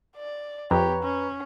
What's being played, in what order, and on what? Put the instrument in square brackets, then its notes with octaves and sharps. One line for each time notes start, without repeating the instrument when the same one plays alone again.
[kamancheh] D5
[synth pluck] F2 [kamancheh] G4 C#5 [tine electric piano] B4 A#5
[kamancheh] C#4